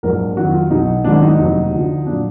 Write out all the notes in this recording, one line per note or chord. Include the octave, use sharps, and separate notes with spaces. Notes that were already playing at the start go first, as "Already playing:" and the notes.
A#1 G#2 F#3 A#4
F2 D#3 F#3 F#4
F4
B1 B2 F#3 D#4
G#1 G#2 D#3 F#3 D4
D#4
F1 D#2 D#3 F#3
D2 D3 F3
A#2 F#3 D4